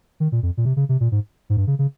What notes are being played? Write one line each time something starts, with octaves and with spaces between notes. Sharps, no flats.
D#3
A#2
F2
A#2
C3
C#3
C3
A#2
G#2
G#2
G2
C#3
C#3